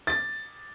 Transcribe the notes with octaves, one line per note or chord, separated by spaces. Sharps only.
A6